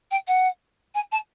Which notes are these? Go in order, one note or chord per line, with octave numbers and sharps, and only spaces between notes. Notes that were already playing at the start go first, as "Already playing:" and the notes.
G5
F#5
G#5
A5